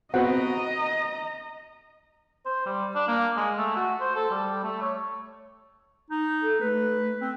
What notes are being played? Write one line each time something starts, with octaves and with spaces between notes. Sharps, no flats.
B3 C4 F#4 D#5 F#5 A#5
C5
G3
D4
A#3
G#3
A3
F#4
C5
A4
G3
A3
C#5
D#4
A4
A3 B4
C4